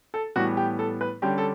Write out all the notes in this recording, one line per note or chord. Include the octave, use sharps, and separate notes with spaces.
A4
A2 E3 G3 B3 F#4
G4
A4
B4
D3 G3 C#4 G4
A4